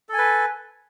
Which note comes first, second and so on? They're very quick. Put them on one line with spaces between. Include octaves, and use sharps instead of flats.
A4 G#5 B4